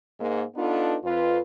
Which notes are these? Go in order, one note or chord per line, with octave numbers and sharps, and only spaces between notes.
G#2 A#3
B3 D4 D#4 F4 A4 B4
F2 F4 B4